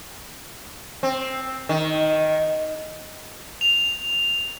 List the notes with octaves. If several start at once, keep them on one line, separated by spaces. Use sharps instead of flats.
C4
D#3
F7